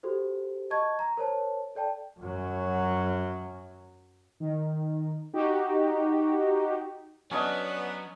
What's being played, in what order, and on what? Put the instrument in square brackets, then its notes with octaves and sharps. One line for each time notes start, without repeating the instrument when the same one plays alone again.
[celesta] F#4 G4 A4 C5
D#5 A5 C#6 G#6
A#5
A#4 C5 C#5 A5
A4 D5 G5 A5
[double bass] F#2 F#3
[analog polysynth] D#3
D#4 F#4 G4
[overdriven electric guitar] F#3 [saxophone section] B3 [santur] C#4 D4 D#5 [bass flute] D5